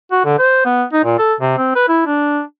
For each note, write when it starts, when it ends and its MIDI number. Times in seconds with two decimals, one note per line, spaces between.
0.11 0.21 66
0.25 0.36 50
0.39 0.65 72
0.65 0.84 59
0.93 1.03 63
1.04 1.15 46
1.19 1.34 69
1.41 1.53 48
1.58 1.73 60
1.75 1.87 71
1.89 2.02 64
2.07 2.41 62